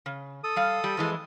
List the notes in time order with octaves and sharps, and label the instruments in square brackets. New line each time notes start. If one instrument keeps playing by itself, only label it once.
[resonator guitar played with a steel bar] C#3
[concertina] A4 D#6
[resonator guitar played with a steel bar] G3 F5
G3
F2 E3 G#3